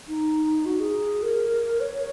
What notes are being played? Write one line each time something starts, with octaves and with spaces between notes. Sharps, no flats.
D#4
F#4
G#4
A#4
C#5